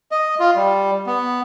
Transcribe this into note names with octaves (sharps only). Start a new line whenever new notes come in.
D#5
F4
G3
B3